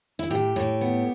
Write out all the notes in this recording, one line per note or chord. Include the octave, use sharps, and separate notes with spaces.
E4
A2 G4
A2
B3